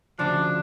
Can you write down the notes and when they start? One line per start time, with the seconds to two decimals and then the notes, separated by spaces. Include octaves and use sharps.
0.19 D2 C#3 F3 D4